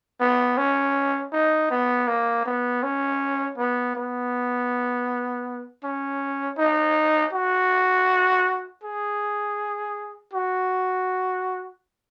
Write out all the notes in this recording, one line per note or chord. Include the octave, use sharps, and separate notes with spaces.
B3
C#4
D#4
B3
A#3
B3
C#4
B3
B3
C#4
D#4
F#4
G#4
F#4